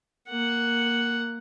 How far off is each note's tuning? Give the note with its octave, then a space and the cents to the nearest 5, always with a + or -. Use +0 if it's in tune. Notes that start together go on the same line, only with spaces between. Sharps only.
A#3 +0 F#5 +0